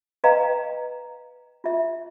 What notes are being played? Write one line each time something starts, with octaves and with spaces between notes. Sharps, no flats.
B4 D#5 F5 G5 A#5
F4 E5